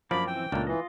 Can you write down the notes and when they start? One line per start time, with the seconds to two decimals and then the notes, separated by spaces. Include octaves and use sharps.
0.11 F#2 F3 A#3 D4 D5 B5
0.27 E3 C4 G5
0.52 C#2 A#2 A3 A#3 D4
0.67 E3 F4 D#5